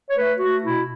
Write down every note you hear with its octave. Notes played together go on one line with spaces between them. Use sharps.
C#5
A3 B4
A3 F#4
B2 E4